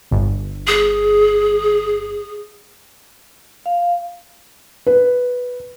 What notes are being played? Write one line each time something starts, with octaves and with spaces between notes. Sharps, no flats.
G1
G#4
F5
B4